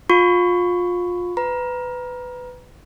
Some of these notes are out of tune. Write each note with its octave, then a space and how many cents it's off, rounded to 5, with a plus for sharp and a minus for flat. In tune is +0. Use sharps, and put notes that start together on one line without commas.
F4 +25 C#6 +0
B4 +20 A#5 +25